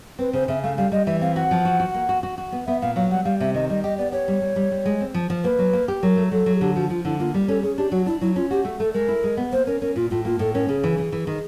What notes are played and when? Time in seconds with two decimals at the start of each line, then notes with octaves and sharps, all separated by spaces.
0.19 C4 B4
0.33 C#3 C5
0.48 C#3 E5
0.63 A3 F5
0.77 G3 F5
0.92 G3 D#5
1.07 E3 E5
1.21 C4 F5
1.36 F#4 F#5
1.51 F3
1.65 F#4
1.80 F#4
1.94 A#3
2.09 F#4
2.23 F#4
2.38 F#4
2.52 B3
2.67 B3 E5
2.82 A#2 F5
2.96 F#3 F5
3.11 G3 F#5
3.25 G3 F5
3.40 C3 E5
3.55 D#3 D#5
3.70 G3 D#5
3.84 G4 D#5
3.98 B3 D5
4.12 G4 C#5
4.28 G3
4.42 G3
4.56 G3
4.72 G3
4.86 G#3
5.01 C4
5.14 F3
5.30 F3
5.44 A#3 B4
5.59 F#3
5.73 A#3
5.88 G4
6.03 F#3 A#4
6.17 A3
6.32 F#3 A4
6.46 F#3
6.56 G#4
6.61 D3 G4
6.75 F3 F#4
6.90 F3 F4
7.05 D3 E4
7.19 A#3 F4
7.34 G3
7.48 C#4 A4
7.63 C#4 G#4
7.78 D4 G4
7.91 F#3 F#4
8.06 D4 E4
8.21 F#3 E4
8.36 C#4 F4
8.51 F#4 G4
8.65 A3
8.79 A3 A4
8.94 G#3 A#4
9.08 E4
9.24 G#3
9.37 B3
9.52 A#3 C5
9.67 C#4 A#4
9.81 C#4 A#4
9.96 A#2 F4
10.10 A2 F4
10.25 A#3 F4
10.39 A2 A4
10.54 C#4 A#4
10.69 C#3 G#4
10.84 E3
10.98 E3
11.12 E3
11.27 D#3